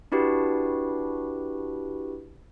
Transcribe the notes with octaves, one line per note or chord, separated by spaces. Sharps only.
D4 E4 F#4 G4 B4